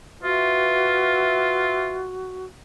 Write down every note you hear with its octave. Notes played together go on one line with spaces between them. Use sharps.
F4 F#4 B4 E5